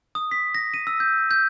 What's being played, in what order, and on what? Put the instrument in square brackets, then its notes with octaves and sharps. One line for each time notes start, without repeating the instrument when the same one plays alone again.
[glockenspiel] D#6
B6
A#6
D#7
E6
G6
G6